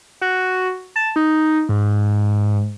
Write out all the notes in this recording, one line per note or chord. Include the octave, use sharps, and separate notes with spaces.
F#4
A5
D#4
G#2